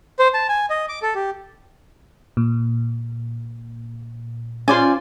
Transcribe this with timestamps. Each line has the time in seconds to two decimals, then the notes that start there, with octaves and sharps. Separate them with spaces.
0.19 C5
0.34 A5
0.49 G#5
0.70 D#5
0.89 D6
1.02 A4
1.15 G4
2.37 A#2
4.68 C#4 F4 C5 D5 G#5